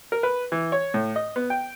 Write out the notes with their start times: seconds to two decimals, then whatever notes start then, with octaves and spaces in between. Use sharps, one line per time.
0.12 A#4
0.23 B4
0.52 E3
0.72 C#5
0.94 A2
1.16 D#5
1.36 B3
1.50 G5